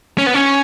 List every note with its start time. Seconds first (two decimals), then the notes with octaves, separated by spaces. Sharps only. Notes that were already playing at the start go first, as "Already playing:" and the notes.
0.18 C#4
0.27 B3
0.34 C#4